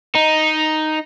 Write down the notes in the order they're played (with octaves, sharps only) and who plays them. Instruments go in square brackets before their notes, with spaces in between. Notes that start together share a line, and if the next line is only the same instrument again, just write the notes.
[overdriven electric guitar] D#4